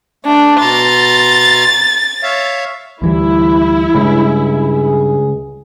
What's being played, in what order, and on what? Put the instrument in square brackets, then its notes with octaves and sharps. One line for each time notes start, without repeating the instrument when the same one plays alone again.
[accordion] A3 [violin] D4
[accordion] B2 A#5 C6 [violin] A6
[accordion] C#5 E5 F5
[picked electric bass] D2 E3 G3 [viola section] E4
[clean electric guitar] C#2 [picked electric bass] G2 G#3 [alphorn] G#4